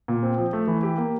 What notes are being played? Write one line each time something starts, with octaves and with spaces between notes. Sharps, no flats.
A#2
C4
F3
A3
E3
G4
A#3